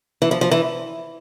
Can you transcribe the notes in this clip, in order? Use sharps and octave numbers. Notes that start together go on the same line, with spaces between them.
E3
F3
F3
E3